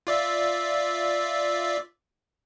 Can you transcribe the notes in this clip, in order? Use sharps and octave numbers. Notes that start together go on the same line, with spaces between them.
F4 D5 E5